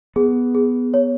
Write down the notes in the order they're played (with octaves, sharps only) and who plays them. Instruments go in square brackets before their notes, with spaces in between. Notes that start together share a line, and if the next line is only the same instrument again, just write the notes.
[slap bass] B3 [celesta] G#4
[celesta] G#4
C#5